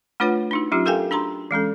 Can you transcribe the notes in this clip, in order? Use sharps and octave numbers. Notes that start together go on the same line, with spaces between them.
A3 D4 F4 B4 C#5 F#5
D4 D#4 F#4
F#3 C#4 D#4 F4 G4
G4 A4 A#4 F5 G5 G#5
D4 F#4 A#5 C6
E3 G#3 C#4 A4